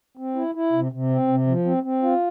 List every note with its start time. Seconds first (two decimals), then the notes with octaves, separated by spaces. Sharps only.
0.17 C4
0.35 E4
0.55 E4
0.73 C3
0.92 C3
1.10 C4
1.28 C3
1.47 F3
1.65 C4
1.83 C4
2.02 F4